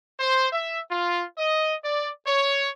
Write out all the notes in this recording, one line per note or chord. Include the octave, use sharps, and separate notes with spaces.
C5
E5
F4
D#5
D5
C#5